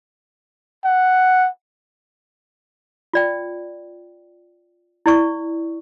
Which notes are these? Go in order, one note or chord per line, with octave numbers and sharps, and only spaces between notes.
F#5
F4 D5 G5
E4 D5 C#6